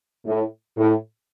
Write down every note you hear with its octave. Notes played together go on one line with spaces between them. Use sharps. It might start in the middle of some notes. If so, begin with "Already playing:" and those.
A2
A2